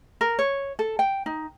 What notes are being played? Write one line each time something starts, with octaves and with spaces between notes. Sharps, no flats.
A#4
C#5
A4
G5
D#4